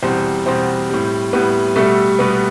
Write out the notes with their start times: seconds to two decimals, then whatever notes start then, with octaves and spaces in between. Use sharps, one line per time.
0.02 E2 B2 G3 C4 C5
0.46 E2 B2 G3 C4 C5
0.90 A2 G3
1.33 A2 G3 B3 B4
1.76 B2 G3 A3 A4
2.19 B2 G3 B3 B4